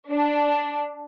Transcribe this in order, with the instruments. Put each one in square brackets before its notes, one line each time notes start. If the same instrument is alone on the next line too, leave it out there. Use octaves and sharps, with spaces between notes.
[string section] D4